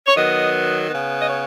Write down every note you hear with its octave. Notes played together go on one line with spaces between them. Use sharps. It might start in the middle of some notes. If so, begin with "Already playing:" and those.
C#5
D#3 F#3 B3 D#5
C#3 B3
D#5
C#5